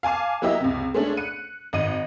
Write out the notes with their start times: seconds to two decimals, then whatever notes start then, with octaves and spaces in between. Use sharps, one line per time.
0.03 F5 G#5 A5 D6
0.42 F#3 A#3 E4 G4 D#5 E5
0.60 C#2 C3
0.94 G#3 A3 C#4 D4
1.17 F#6 C#7 D#7
1.73 G#1 D#5 D#7